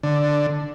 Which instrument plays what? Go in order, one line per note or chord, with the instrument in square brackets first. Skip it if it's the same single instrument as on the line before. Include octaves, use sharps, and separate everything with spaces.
[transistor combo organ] D3